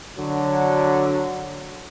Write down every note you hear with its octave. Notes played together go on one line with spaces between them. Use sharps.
D3 F#3